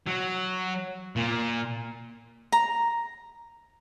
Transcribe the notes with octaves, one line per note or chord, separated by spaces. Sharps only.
F#3
A#2
A#5